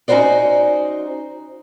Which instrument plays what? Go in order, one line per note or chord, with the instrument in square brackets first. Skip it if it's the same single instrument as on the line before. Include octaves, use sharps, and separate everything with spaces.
[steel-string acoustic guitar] C#4 D#4 F4 F#4 C5 D5